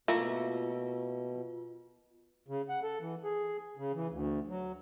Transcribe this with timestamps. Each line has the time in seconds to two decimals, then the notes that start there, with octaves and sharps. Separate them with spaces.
0.08 B2 A3 A#3 E4 F4 E5
2.48 C#3
2.69 F#5
2.83 A4
3.00 E3
3.24 G#4
3.77 C#3
3.95 E3
4.11 D2
4.48 F#3